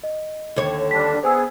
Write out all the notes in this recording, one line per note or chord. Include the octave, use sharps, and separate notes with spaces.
D#5
D#2 D3 C#5
G3 D4 B6
B3 G#4 C5 G#5 E6